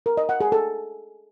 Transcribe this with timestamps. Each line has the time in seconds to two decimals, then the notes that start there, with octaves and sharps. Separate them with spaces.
0.06 A#4
0.17 D#5
0.29 F#5
0.41 G#4
0.52 A4